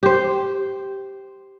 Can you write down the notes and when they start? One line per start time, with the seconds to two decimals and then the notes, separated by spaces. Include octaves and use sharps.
0.03 G4 C5